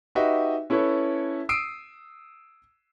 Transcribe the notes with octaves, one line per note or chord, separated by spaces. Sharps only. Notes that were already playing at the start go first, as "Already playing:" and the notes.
D#4 F#4 G4 B4 D#5 E5
C#4 E4 A4 B4 C#5
D#6 E6 C7 D7 D#7